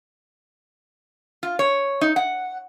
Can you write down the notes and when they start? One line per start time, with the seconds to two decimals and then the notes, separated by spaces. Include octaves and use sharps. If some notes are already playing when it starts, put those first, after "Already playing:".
1.43 F4
1.59 C#5
2.01 D#4
2.16 F#5